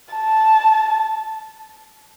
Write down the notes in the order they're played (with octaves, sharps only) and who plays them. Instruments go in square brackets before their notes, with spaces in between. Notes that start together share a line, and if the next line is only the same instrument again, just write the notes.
[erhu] A5